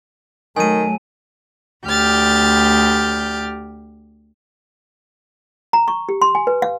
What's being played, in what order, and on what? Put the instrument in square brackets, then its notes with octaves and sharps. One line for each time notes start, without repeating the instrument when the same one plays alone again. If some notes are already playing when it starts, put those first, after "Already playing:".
[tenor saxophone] D#3 [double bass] F#3 A3 [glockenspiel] G#5 D#7
[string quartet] D2 G4 F6 G6 A6
[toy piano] A#5
C#6
G4
C6
G#5
B4
F5